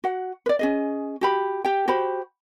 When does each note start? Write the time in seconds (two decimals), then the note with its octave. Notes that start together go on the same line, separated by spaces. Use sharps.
0.04 F#4 F#5
0.46 B4 D5
0.59 C#4 G#4 D#5
1.21 F#4 G4 B5
1.65 G4 G5
1.88 F#4 G4 C5 B5